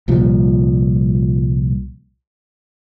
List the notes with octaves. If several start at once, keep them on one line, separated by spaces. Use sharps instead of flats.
C2 A#2 F3 G3